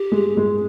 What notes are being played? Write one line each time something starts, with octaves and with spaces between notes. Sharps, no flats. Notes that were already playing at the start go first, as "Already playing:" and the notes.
Already playing: G4
G#3
G#3